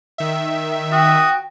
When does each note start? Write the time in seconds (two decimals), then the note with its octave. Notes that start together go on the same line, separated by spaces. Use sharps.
0.18 D#3 E5
0.92 F#4 G5 D#6